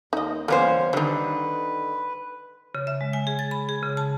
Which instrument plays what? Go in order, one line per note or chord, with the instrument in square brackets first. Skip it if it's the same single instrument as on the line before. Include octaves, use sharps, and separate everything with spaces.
[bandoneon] D#2 [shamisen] D#4 D#5
[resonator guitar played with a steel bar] E2 C#4 C5 [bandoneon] G3 [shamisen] A#3 B3
[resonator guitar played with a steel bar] D3 D#3 [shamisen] G3 D#4 [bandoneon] B4
[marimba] C#3
E5
G#3
G#5
G#4
A6
B5
G#4
C#3
A5